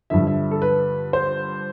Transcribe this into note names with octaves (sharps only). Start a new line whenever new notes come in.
G2 D3 F3 E5
E5
A4
B4
C5